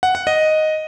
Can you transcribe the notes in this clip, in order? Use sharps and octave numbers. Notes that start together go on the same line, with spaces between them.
F#5
F#5
D#5